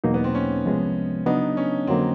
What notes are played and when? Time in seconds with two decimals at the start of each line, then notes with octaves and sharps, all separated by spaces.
0.04 E2 B2 F#3 A#3 D#4
0.14 B3
0.24 C4
0.35 C#4
0.65 C2 C3 F3 G#3 B3
1.26 C#3 F#3 B3 D4 D#4
1.57 C#4
1.87 F2 D3 F#3 A#3 C4